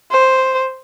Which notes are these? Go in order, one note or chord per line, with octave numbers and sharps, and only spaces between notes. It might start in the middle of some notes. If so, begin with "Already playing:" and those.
C5